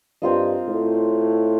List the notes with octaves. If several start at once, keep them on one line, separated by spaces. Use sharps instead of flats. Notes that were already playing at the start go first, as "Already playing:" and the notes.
G2 C4 F4 A#4 D#5
A2